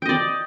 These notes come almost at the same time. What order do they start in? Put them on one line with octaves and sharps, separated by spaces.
G5 D#5 D5